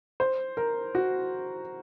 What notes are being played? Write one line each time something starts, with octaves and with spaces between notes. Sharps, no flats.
C5
A#4
F#4